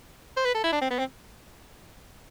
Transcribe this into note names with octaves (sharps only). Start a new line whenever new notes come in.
C5
B4
A4
E4
D4
C4
B3
C4